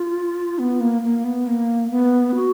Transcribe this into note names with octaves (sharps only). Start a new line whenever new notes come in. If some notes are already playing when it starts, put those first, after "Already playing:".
Already playing: F4
B3
A#3
A#3
B3
A#3
B3
F#4